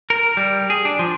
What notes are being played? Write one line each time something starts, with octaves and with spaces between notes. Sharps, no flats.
A#4
G3
G#4
D4
F3